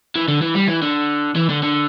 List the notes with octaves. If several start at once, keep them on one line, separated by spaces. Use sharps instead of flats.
E3
D3
E3
G3
E3
D3
E3
D3
D3